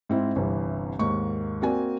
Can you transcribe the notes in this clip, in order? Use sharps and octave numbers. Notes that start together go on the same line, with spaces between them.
G#2 C4 E4
G1 C2 C3 E3
D#2 G#2 A#3 C#6
A#3 C4 F#4 D5 G#5